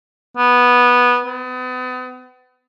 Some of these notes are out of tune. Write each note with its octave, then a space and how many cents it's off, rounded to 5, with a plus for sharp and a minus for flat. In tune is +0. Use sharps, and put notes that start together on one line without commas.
B3 -10
B3 +40